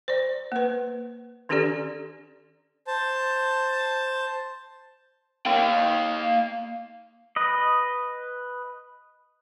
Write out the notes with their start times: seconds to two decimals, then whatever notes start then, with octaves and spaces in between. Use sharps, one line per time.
0.08 C5 D5
0.52 A#3 B4
1.49 D#3 C#4 D4 G4 A4 D5
2.87 C5 A5
5.46 A#3 G5
7.36 B4 D#5